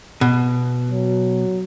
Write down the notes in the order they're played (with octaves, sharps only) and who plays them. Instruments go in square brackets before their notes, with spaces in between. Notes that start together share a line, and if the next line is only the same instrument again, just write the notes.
[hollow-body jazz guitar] B2
[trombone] F#3